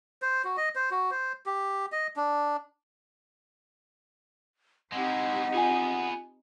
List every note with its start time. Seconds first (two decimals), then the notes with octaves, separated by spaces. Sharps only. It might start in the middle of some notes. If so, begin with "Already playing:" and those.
0.22 C5
0.45 F#4
0.57 D#5
0.75 C5
0.91 F#4
1.11 C5
1.46 G4
1.92 D#5
2.16 D4
4.92 G#3 C4 D#4 E4 G4 F#5
5.54 B3 F4 G#4 G#5